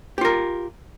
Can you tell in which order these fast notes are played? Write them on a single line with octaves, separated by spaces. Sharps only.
G4 F4 A#4